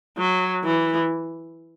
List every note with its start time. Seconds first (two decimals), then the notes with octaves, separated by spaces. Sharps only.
0.18 F#3
0.64 E3